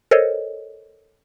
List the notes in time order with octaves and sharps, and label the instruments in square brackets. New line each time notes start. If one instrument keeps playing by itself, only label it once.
[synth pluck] A4 A#4 C5 C#5 D#5